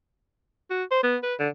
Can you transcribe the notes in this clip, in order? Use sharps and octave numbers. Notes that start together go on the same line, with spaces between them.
F#4
C5
B3
B4
D3